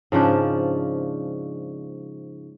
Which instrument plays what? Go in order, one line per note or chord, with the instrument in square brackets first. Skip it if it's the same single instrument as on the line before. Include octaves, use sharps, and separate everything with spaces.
[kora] G#2 C#3 F3 D4